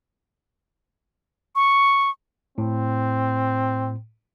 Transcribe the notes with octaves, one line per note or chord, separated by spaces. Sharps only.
C#6
A2 C4